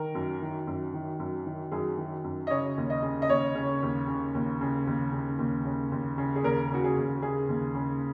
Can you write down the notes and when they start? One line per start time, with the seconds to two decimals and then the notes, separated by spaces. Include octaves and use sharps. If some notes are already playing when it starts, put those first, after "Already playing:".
Already playing: D#3 A#4
0.15 F#2
0.42 D#3
0.67 F#2
0.93 D#3
1.19 F#2
1.46 D#3
1.71 F#2 G#4
1.98 D#3
2.24 F#2
2.47 D#5
2.50 C#3 C#5
2.78 D#2
2.90 D#5
3.03 C#3
3.22 D#5
3.29 D#2 C#5
3.55 C#3
3.82 D#2
4.07 C#3
4.35 D#2
4.61 C#3
4.87 D#2
5.12 C#3
5.39 D#2
5.65 C#3
5.92 D#2
6.18 C#3
6.36 G#4
6.43 D#2 A#4
6.71 C#3 F#4
6.84 G#4
6.97 D#2
7.22 C#3 G#4
7.49 D#2
7.74 C#3